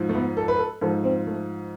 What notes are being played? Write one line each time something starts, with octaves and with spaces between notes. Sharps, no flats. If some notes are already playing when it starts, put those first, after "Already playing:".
Already playing: G#2 F3
A3
B3
A4
B4
A4
G#2 F3 A4
C4
A3